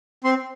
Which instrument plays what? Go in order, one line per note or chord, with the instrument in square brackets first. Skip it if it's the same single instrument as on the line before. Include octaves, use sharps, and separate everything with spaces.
[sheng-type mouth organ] C4 C6